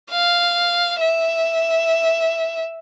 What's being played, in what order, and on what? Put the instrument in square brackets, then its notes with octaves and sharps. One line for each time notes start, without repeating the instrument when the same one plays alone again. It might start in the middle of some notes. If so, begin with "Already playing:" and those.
[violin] F5
E5